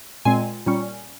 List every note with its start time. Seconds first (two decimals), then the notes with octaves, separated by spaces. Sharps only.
0.25 A#2 G#3 C4 G#5
0.66 A#2 G3 C#4